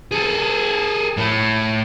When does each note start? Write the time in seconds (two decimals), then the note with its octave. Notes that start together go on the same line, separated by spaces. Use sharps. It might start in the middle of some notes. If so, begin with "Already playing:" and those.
0.12 G#4 A4
1.18 A2